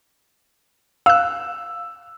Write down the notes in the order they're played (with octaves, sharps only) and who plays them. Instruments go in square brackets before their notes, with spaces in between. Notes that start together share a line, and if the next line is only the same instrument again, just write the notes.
[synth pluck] F5 F#6 [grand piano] E6